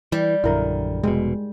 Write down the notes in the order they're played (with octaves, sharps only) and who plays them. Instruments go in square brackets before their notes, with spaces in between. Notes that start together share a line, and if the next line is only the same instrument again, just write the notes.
[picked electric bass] E3 [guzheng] G3
[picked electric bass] A#1 F#2 D3 [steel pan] E4 A#4
[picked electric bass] F1 G#2 B2 [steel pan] G#3